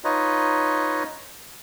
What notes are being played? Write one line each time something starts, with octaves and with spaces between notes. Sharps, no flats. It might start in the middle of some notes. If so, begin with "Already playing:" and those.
D#4 F4 B4 C#5 D#5